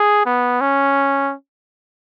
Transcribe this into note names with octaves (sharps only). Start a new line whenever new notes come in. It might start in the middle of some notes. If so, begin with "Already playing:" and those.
Already playing: G#4
B3
C#4